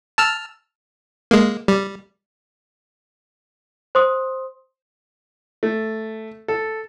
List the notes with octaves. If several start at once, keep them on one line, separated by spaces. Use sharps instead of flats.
A5 E6 F6
G#3 A#3
G3
C5 C6 D#6
A3
A4